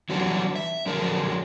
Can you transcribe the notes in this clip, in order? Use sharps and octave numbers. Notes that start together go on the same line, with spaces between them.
E3 F#3 G3 B3 D4 F#4
E5
D3 F3 F#3 G#3 D4 A#4